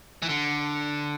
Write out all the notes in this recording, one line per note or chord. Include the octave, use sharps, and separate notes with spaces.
E3
D3